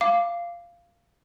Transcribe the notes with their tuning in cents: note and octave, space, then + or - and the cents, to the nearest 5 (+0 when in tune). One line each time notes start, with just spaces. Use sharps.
F5 -10 D6 +0